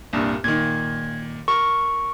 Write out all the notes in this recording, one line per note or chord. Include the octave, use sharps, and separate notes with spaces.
C2 G2 A#2
A#2 D#3 G#6
A#4 C#6